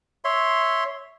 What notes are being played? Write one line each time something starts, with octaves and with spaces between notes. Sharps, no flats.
C#5 E5 C6